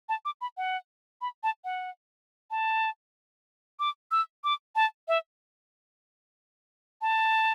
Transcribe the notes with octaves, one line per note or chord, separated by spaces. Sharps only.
A5
D6
B5
F#5
B5
A5
F#5
A5
D6
E6
D6
A5
E5
A5